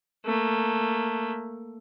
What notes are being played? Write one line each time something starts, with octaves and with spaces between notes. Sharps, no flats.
A3 A#3